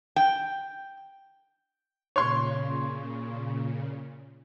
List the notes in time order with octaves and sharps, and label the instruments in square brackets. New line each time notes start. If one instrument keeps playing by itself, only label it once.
[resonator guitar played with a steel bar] G5
[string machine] A#2 C#3 [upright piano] C#5 C6